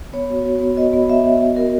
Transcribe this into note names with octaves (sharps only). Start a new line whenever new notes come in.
B3 C#5
F#4
F#4
B3
F#4 D#5
B3
F#4 E5
F#4
B3 D#5
F#4 A#4